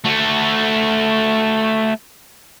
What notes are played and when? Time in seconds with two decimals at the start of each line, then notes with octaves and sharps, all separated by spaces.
0.05 A3 F#4